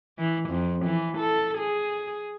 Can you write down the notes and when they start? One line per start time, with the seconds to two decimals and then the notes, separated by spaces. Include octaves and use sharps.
0.18 E3
0.50 F2
0.85 E3
1.18 A4
1.58 G#4